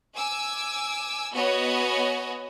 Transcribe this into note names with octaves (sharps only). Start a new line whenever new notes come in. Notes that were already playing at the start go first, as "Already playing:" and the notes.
G#5 D6 E6
B3 F#4 C#5 D#5 G#5